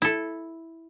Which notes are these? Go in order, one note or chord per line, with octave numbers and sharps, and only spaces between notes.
E4 A4